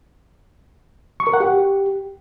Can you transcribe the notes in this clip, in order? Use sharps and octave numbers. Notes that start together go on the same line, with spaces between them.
C#6
A#4
F#5
G4